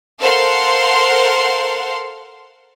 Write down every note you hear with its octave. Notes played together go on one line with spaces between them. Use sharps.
A4 A#4 C5 F5 F#5 C6